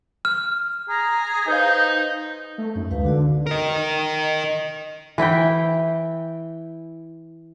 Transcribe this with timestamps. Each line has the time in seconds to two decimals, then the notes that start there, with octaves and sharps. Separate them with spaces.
0.25 F6
0.89 G#4 A#5
1.48 D#4 B4 C5 F5 G6
2.58 A3
2.75 F#2 D#4
2.91 D2 G#3 B4 F5
3.04 D3 D4 F#4 D5
3.47 A#4 D#5
5.18 E3 E4 E5 G5